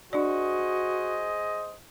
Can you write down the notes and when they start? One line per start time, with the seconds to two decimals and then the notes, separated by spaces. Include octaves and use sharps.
0.13 D4 F#4 G#4 C5 D5 D#5